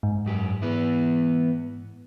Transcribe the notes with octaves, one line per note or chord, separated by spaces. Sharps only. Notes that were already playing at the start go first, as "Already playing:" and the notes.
G#2
F#2 G4
E3 B3 E4